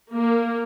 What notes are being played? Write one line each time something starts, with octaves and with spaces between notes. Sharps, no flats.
A#3